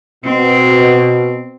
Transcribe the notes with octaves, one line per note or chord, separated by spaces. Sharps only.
B2 C4